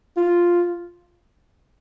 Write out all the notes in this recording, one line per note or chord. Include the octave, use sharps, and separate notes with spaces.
F4